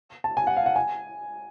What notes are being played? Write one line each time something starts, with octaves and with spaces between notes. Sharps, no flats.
A5
G#5
F#5
F5
F#5
G#5